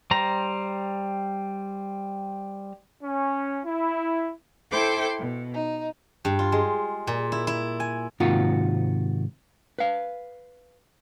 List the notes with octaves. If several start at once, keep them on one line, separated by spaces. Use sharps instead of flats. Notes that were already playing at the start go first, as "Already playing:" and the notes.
G3 C5 A#5
C#4
E4
E4 A4 C5 G5 C6 D6
B2
D#4
G2
F4
G#3
A#2
E4
E4
G#5
G#2 C3 D#3 A#3 F4 F#4
B4 F5